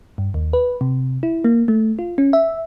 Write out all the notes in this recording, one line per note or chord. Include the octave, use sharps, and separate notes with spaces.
G2
D#2
B4
C3
E4
A#3
A3
F4
C#4
E5